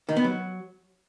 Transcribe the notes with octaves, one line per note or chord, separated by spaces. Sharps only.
D#3
B3
F#3